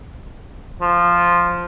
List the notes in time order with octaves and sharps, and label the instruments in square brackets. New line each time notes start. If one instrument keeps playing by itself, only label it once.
[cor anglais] F3